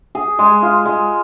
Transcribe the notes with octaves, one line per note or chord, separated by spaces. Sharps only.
G#4
G#3
F4
G#3